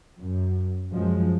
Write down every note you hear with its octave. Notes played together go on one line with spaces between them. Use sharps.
F#2
F#2 F3 G#3